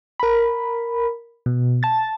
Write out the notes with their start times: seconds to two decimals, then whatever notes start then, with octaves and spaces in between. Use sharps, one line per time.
0.20 A#4 B5
1.46 B2
1.83 A5 A6